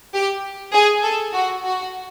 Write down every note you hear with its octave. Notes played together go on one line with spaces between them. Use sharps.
G4
G#4
A4
F#4
F#4